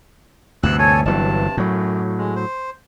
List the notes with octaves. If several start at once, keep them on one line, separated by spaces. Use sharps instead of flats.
D2 G2 C3 E6 F#6
A4 C#5 G#5
G1 G2 C3 E3 F#3 A5
F#2 A2 F#3
G#3
C5